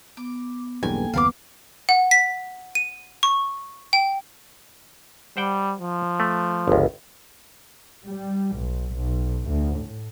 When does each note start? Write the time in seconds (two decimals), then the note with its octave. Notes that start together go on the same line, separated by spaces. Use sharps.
0.17 B3 D6
0.83 B1 E2 G2 A#3 A4 G5 G#5
1.14 F#1 D#2 B3 F5 B5 D6
1.89 F#5
2.11 B6
2.75 D#7
3.23 C#6
3.93 G5
5.37 G3 C5 F#5 G5
5.81 F3
6.20 A3
6.68 G1 C#2
8.07 G3
8.56 B1
8.96 B1
9.48 D2
9.78 A2